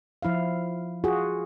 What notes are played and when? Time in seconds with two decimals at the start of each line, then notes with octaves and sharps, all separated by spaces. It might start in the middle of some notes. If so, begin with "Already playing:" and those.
0.22 F3 E4 E5 F5
1.04 F4 F#4 G#4